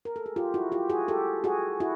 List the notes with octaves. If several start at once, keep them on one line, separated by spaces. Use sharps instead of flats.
A#4
A4
G#4
F4 G4
E4 F#4
F4 G4
F#4 G#4
G4 A4
F#4 G#4
E4 F#4